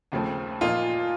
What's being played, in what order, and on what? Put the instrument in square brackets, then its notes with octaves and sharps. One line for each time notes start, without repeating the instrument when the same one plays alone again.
[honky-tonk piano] D#2 C#3 F3 A3 C4
[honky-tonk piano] A#2 F3 A#3 D#4 [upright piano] F4